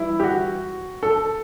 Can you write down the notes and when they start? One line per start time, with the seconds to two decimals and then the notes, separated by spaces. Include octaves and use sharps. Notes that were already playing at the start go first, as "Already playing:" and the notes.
Already playing: E3 G3 E4
0.20 G4
0.24 F#4
1.03 A4